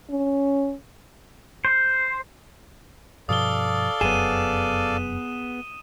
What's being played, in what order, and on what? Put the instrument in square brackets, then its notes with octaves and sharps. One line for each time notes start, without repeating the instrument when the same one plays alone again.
[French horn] C#4
[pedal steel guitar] C5
[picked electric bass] G2 B2 F3 [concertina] A4 D5 F5 [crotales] D#6 G7
[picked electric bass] F1 F#2 [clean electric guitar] B3 G#4 [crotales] D#7 E7